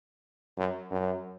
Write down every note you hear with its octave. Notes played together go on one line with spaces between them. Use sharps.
F#2
F#2